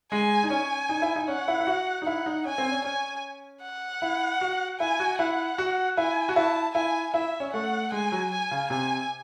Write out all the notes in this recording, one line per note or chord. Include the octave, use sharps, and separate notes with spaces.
G#3 G#5
D#4
C#4 G#5
D#4
E4
D#4
C#4 F#5
E4
E4
F#4
D#4
E4 F#5
D#4
C#4 G#5
C4
C#4
C#4 G#5
F#5
E4
F#4
E4 G#5
F#4
E4 F#5
F#4
E4 G#5
F#4
E4 A5
E4 G#5
E4 E5
C#4
A3 F#5
G#3 G#5
F#3
G#5
C#3
C3 G#5